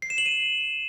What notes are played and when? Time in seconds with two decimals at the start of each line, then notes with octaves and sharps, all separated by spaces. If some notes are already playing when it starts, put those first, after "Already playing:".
0.02 C7
0.10 E7
0.18 F#7
0.26 D#7